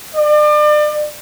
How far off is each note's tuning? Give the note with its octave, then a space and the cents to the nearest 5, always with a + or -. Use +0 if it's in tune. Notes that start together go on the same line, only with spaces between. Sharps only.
D5 +35